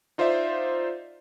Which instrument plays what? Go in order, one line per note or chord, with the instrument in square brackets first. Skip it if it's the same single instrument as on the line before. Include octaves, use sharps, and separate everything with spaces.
[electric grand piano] D#4 F4 C5 D5 E5